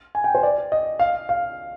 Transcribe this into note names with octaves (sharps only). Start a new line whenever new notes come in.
G#5
G5
C5
D5
D#5
F5
F5